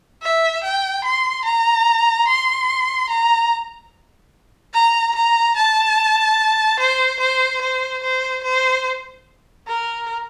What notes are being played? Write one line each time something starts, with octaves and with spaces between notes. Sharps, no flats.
E5
G5
C6
A#5
C6
A#5
A#5
A#5
A5
C5
C5
C5
C5
C5
A#4